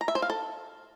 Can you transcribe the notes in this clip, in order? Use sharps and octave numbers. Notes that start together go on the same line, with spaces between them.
A#5
E5
C5
F5
A4